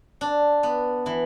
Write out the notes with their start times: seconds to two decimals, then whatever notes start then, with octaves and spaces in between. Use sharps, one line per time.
0.21 D4
0.63 B3
1.06 E3